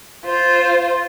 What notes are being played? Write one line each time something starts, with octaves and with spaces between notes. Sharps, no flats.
F4 C5